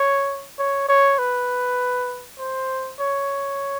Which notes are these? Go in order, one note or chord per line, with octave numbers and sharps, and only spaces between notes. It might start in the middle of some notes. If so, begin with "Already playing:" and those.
Already playing: C#5
C#5
C#5
B4
C5
C#5